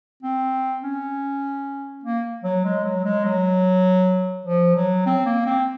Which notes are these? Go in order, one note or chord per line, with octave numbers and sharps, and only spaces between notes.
C4
C#4
A#3
F#3
G#3
F#3
G#3
F#3
F3
F#3
C4
A#3
C4